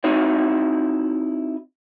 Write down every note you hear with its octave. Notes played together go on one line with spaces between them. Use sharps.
C4 D#4 E4 F#4 C#5